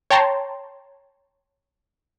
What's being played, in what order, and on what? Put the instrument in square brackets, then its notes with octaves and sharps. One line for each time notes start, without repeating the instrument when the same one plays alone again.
[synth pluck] C#5 G5 A5 A#5 C6